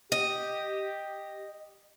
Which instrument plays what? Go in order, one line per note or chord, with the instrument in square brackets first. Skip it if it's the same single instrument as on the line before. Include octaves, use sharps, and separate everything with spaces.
[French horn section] G4 [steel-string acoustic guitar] D#5